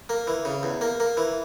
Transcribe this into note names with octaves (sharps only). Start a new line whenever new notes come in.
A#3
E3
C#3
E2
A#3
A#3
E3